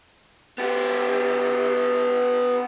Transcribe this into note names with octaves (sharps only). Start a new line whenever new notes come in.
B3 G4